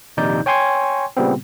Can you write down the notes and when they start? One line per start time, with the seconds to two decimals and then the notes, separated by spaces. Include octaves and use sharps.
0.17 A#1 D#2 C3 D#4 D5 G6
0.46 C#5 G5 G#5 C6 C#6 G#6
1.17 A#2 C#3 G3 B3 C4